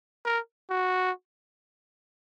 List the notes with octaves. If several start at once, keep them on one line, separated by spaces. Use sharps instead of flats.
A#4
F#4